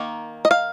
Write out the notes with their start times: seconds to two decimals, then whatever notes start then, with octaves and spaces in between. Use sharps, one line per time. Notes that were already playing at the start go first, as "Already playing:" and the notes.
Already playing: D#3 A#3 D#4
0.45 D#5
0.51 F5